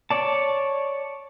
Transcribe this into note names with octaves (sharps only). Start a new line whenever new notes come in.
C#5 D5 A5